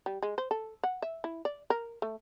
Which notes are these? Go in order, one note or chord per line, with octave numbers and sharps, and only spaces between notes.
G3
G#3
C5
A4
F#5
E5
E4
D5
A#4
A3